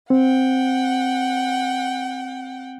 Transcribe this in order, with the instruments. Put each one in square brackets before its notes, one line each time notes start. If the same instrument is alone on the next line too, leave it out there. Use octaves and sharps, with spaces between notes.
[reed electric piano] C4 [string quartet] F#5 G5